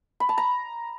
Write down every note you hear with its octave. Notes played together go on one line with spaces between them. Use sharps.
B5
A5
A#5